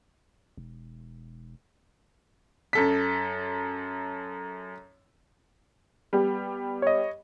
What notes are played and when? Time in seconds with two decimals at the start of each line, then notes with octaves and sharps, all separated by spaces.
0.57 E1
2.73 F#2 A4 B6
6.13 G3 B3 G4
6.82 C#5 D#5